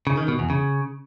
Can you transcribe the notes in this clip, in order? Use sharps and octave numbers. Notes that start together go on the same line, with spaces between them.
C#3
D#3
B2
E2
C#3